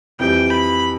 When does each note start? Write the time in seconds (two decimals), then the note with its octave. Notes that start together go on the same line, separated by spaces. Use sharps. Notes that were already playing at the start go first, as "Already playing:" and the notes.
0.19 F2 E3 G3 G5
0.50 B5